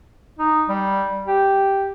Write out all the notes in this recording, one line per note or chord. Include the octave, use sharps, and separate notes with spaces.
D#4
G3
G4